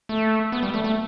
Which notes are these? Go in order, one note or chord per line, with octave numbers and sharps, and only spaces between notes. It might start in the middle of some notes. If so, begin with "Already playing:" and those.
A3
B3
G3
A3
A3